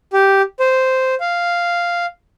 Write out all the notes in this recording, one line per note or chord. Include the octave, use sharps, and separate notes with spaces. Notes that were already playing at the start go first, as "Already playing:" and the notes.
G4
C5
F5